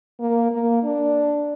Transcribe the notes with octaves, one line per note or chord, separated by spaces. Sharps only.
A#3
A#3
D4